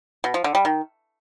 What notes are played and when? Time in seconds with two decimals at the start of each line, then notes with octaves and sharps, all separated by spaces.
0.24 B2
0.34 F3
0.44 D3
0.55 G3
0.65 D#3